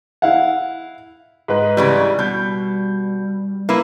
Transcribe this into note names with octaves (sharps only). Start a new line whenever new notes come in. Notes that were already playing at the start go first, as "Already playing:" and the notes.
E4 F5 F#5
G#2 D#4 B4
C#3 E3 G3 C#6
B2 G3 G6
A#3 E4 B4